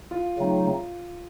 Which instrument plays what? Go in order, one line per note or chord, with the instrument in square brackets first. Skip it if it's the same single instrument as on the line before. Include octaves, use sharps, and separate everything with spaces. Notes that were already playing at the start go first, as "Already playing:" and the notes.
[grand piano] F4
[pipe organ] C#3 F#3 A3 C4 D#4